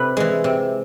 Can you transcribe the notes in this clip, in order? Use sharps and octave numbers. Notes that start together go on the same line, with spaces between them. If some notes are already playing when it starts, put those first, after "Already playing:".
Already playing: C3 B4
E3 G#3
C3